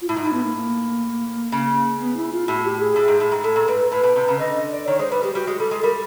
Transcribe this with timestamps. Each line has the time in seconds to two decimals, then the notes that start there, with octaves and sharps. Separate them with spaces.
0.01 F4
0.09 A2 E4
0.17 G#2
0.21 A2 D#4
0.33 B3
0.45 A#3
0.56 A#3
1.52 C#3
2.00 B3
2.17 E4
2.33 F4
2.48 A2 F#4
2.64 G4
2.80 G#4
2.96 A2
3.08 G#2
3.20 A2
3.32 G#2
3.44 A2 A4
3.56 A#2
3.68 G#2 B4
3.92 A2 B4
4.03 B2
4.16 C3
4.28 C#3
4.39 D3 D#5
4.55 D#5
4.71 D5
4.87 D#3 C#5
4.99 G#3 C5
5.11 G3 B4
5.23 G#3 G4
5.35 G3 F#4
5.47 G#3
5.59 G3 A4
5.71 G#3
5.83 G3 A#4